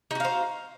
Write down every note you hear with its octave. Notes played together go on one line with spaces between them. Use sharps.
D#4 F#4 C5 F5